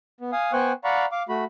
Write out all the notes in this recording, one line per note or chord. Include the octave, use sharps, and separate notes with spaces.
B3
F5 G#5 D#6
B3 C5 G5 G#5 C#6 F#6
D5 F5 F#5 A#5 B5 C#6
F5 D6
A3 F#4 B5